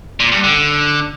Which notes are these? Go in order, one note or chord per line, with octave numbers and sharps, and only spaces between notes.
A#2
G2
D3